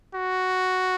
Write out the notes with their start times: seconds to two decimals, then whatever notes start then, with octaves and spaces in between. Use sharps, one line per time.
0.15 F#4